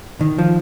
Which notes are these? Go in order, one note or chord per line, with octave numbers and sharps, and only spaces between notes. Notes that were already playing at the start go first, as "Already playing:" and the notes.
D#3
F3